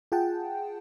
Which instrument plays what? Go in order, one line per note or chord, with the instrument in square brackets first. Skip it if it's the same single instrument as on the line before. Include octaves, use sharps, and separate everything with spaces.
[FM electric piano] F4 G#4 F#5 G5 A5